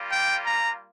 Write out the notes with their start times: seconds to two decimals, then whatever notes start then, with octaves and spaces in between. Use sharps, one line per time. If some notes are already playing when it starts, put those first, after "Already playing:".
Already playing: G3 A#3 F4
0.10 G5
0.45 A#5